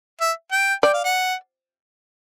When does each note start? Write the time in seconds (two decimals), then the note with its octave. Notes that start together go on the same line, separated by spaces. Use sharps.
0.21 E5
0.52 G5
0.83 D5 G5
0.94 F5
1.05 F#5